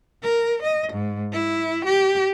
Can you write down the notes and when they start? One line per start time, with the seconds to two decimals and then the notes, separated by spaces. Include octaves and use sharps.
0.23 A#4
0.63 D#5
0.93 G#2
1.33 E4
1.86 G4